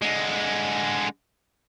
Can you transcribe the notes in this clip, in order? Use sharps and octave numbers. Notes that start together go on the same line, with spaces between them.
D3 G#3